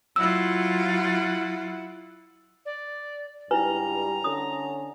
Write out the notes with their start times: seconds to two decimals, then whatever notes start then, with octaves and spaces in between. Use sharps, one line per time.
0.16 F#3 E4 F4 F#5 E6
2.66 D5
3.51 C#2 G2 G3 E4 B4 G#5 A#5
4.24 D3 C#4 D#6